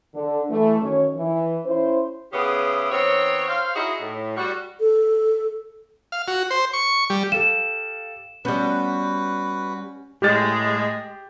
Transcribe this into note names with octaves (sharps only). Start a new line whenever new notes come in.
D3
E3 A3
F#2 D#3 C#4 C#5
E3
C#4 E4 C5
C#3 B3 E4 G4 G#4
D#3 B3 C4 C#5
C5 C#5 F5
D#4 E4 F#4 G#4
A2
G3 F#4
A4
F5
F#4
C5
C#6
G3
G4 A4 F5 E7
G3 B3 C#4 F#4 B4 G6
A2 G#3 G4 G6 A6